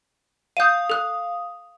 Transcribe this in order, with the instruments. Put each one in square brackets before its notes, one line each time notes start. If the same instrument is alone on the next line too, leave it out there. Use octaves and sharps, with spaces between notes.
[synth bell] F5 D#6 [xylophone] G6 D#7
[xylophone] A4 F#6